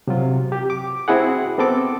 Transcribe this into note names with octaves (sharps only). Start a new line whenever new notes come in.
C3 F#3 F4
G4
D6
C4 E4 F#4 G#4 F#5
B3 C4 A4 D6